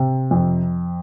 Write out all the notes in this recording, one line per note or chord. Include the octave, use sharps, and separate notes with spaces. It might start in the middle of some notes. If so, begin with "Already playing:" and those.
Already playing: C3
F2